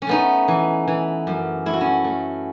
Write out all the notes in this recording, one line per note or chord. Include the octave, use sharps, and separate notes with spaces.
C#4
A3 B3 D#4
E3
E3
F#2
A3 E4
F#4
C#4 E4
A3